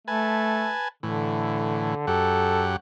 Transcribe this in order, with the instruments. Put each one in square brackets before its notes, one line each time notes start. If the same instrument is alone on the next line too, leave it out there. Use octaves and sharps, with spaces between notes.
[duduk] A3 [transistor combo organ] B4 G#5 A5
[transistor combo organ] A2 E3 [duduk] D3
[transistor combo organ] F#2 G4 F#5 [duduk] A4